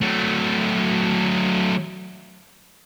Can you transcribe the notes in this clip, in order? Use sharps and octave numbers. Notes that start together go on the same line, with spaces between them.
F#3 A3